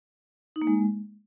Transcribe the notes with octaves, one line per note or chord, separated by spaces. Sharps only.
D#4
A#3
G#3